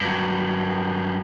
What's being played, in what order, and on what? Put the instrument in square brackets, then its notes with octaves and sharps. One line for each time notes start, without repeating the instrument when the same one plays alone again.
[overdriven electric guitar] G2 F#3